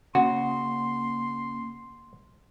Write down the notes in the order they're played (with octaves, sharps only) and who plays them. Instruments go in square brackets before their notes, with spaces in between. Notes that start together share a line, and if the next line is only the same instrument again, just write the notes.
[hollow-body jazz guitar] C#3 [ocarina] A#3 [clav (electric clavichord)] F#4 [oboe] C6